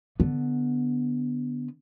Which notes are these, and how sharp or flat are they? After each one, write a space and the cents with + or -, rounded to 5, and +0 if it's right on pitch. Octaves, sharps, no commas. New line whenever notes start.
D3 +0 B3 +0